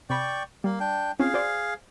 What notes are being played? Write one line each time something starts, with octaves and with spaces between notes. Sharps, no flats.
C3 D5 G5 B5 C#6
G3 A#3
D4 G5
C4 C#4 F4 G#4 F5
F#4 C5 D5